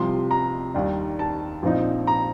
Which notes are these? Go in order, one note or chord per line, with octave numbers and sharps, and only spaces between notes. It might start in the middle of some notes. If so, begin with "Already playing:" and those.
Already playing: C2 C3 F3 C6
A#5
D#2 D#3 G3 D4
A5
A#1 A#2 F3 C4 D#4
A#5